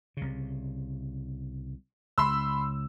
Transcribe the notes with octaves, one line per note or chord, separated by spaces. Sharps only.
C2 C#3
C#2 B5 C6 E6